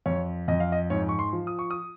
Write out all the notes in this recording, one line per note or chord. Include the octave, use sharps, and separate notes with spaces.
F2 C#5
F2 D#5
F5
D#5
G#2 C#5
C#6
C6
F3
D#6
C#6
D#6